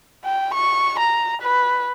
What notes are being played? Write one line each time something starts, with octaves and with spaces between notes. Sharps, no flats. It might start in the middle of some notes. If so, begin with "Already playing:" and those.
G5
C#6
A#5
B4